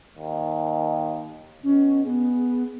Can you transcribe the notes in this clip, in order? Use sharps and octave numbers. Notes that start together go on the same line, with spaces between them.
D#2
B2 C#4
B3 G#4